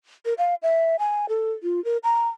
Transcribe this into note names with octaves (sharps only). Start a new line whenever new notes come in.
A#4
F5
E5
G#5
A4
F4
A#4
A#5